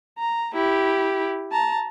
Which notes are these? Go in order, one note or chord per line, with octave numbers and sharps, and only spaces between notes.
A#5
E4 G4
A5 A#5